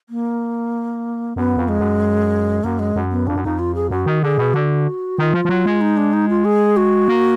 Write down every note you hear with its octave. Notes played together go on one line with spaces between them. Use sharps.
A#3
F#2 B3
F2
G#3
F#2
F#2 A#3
G#3
F#2
B3
F2 D4
F#2
F2 D#4
F4
G#4
F#2 F#4
D#3
D3 G#4
B2
D3 F#4
D#3 F4
F3
F3
F#3
G#3
D#4
D4
D#4
F4
G#4
F#4
A#3